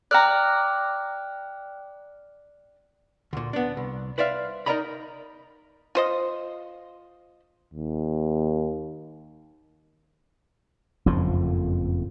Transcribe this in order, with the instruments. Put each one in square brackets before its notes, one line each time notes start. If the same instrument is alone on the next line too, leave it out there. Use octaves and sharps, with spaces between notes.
[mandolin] D5 A#5 [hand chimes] G5 F6 F#6
[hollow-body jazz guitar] D2 A#2
B3 D4
C2
B4 C5 D5 E5 F5
D#4 A#4 D5 D#5 A#5 B5
[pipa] F4 C5 D#5
[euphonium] D#2
[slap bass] F#1 F2 A2 F3